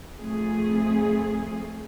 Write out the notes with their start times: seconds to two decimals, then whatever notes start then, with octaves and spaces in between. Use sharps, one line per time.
0.18 F2 A3 G#4